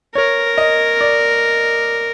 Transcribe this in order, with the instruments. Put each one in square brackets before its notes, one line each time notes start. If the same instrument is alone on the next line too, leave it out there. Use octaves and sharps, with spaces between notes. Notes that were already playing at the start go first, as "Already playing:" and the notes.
[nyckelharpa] A#4 [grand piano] C#5
[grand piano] D#5
D5